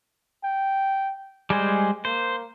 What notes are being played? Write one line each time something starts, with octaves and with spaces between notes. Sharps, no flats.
G5
G3 G#3 C5 G#5
A#3 C5